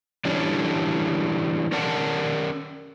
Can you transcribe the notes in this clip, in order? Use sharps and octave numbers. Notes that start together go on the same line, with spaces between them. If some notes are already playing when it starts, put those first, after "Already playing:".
E3 G3 C#4 D4
C#4 A#4 D5 F#5 A5